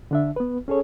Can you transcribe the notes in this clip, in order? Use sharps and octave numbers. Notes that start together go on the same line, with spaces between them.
D3 D4 E5
B3 B4
C#4 G#4 A4 C#5